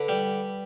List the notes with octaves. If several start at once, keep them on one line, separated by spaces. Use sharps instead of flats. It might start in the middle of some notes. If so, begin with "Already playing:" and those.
Already playing: D3 B4
G3